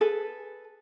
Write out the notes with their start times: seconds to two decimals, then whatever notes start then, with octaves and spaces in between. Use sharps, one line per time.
0.01 G#4 A4 B4